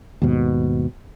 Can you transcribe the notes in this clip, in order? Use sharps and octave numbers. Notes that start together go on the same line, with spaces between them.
D#2 G#2 B2